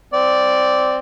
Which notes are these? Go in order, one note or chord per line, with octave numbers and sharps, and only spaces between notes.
C4 D5